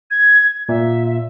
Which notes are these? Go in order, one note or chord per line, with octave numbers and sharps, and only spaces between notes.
G#6
A#2 E5